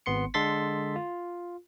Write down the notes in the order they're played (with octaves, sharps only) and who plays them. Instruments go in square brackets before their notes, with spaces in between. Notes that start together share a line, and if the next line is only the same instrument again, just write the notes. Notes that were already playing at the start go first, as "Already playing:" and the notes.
[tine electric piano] G#1 B3 C6 C#7
D3 G#3 A4 C6 A6 B6
F4